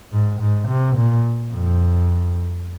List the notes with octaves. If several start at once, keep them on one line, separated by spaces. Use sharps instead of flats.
G#2
G#2
C3
A#2
F2